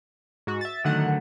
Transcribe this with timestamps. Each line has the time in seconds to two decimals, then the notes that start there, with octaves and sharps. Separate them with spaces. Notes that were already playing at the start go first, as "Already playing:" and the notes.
0.47 G#2 F#4
0.61 E5 A6
0.84 D3 D#3 F#3 A3 F#5